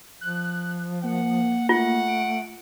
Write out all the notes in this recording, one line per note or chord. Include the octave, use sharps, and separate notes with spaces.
F3 F#6
A#3 F#5
A3 F4 F#5
D7